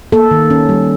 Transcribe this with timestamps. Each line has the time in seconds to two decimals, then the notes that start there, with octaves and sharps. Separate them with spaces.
0.12 A#3 A4
0.31 D#3
0.50 C#4
0.69 G3